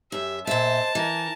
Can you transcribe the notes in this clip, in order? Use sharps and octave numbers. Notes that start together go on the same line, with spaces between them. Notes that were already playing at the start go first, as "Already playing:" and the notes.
F#2 G4 E5
A#2 C5 D#5 E5 A5
E3 A#4